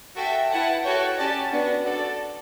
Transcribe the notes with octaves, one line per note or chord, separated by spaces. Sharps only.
F#4 A4 E5 G5
E4 B4 F#5 A5
F#4 A4 C#5 G5
C#4 G4 D5 A5
B3 D4 F#4
F#4 A4 D5